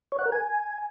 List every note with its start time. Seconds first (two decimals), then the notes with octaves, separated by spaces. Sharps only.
0.12 C#5
0.19 F#5
0.25 A#4
0.32 G#5